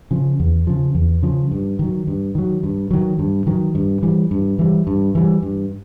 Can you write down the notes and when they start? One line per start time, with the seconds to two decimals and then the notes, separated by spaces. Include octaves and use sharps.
0.11 C#3 F3
0.40 E2
0.67 C#3 F3
0.95 E2
1.23 C#3 F3
1.52 G2
1.79 D#3 F#3
2.07 G2
2.35 D#3 F#3
2.63 G2
2.91 D#3 F#3
3.19 G2
3.47 D#3 F#3
3.75 G2
4.03 E3 G3
4.31 G2
4.59 E3 G3
4.87 G2
5.15 E3 G3
5.42 G2